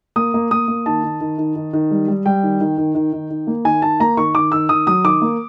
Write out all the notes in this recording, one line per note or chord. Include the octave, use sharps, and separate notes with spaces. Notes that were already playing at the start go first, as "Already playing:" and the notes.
A#3 D#6
A#3
A#3 D#6
A#3
D#3 A5
D#3
D#3
D#3
D#3
D#3
G3
G3
G3 G5
D#3
D#3
D#3
D#3
D#3
D#3
A#3
D#3 G#5
D#3 A5
A#3 A#5
D#3 C#6
D#3 D6
D#3 E6
D#3 D#6
F#3 D#6
D#3 D6
A#3